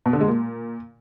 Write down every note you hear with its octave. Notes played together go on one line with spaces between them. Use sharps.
B2
D3
G#3
A#2